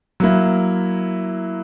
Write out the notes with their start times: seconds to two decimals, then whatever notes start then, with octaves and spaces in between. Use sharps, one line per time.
0.20 F#3 A#3 E4